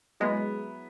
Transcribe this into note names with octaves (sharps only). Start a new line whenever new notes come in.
F#3 G#3 B3 E4